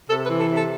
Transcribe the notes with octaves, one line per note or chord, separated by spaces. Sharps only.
C3 A4
B4
E3
A4
C3
A4